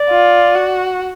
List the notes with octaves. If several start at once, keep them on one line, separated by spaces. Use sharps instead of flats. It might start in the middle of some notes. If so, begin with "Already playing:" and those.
Already playing: D5
F4
F#4